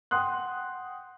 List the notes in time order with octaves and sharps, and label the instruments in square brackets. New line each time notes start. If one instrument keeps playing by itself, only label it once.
[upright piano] F#5 G5 C6 D#6 F#6